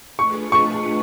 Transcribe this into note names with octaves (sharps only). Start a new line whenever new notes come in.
A3 D4 F4 G#4 B4 C#6
C#6